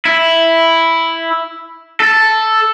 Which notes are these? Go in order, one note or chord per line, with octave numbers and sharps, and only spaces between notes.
E4
A4